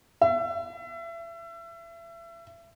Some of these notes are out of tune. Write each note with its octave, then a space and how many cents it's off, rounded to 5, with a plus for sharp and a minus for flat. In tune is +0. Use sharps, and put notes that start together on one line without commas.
E5 +30